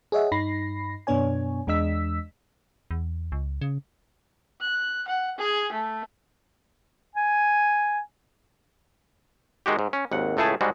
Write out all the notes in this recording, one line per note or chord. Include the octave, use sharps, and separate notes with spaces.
G#4 C#5 D#5 E5 F#5
G2 D#4 B5 A#6 C7
F#2 B2 B3 D4 C#5 G#5
E2 G#3 D4 D#5 E6 B6
E2
C#2
C#3
F#6
F#5
G#4
A3
G#5
D#3 G#3 F#4 G4
G#2
C#4
G#1 D#2 F#5
C#2 A2 A3 E4 G#4 A5
G#2 G3 G#3 F#4